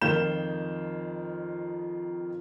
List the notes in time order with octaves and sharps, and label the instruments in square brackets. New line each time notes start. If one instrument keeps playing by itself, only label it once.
[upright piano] F2 D#3 F4 A#4 G6 E7